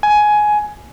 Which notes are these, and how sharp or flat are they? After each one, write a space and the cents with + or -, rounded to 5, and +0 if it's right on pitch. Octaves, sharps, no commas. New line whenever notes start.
G#5 +15